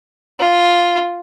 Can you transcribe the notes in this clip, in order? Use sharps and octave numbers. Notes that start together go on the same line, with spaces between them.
F4